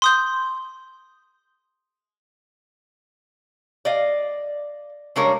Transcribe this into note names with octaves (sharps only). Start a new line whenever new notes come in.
C6 D#6 G6
D5 D#5 F5
C#3 G3 G#3 D4 A#4 C#5